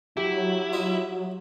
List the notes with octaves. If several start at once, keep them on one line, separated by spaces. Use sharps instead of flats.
F#3 E4 G4
F4 D#5 E5